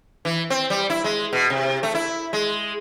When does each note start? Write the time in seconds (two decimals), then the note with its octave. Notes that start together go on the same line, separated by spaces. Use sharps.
0.25 E3
0.50 C4
0.70 G3
0.90 E4
1.04 G#3
1.33 B2
1.50 C3
1.83 A3
1.95 E4
2.33 G#3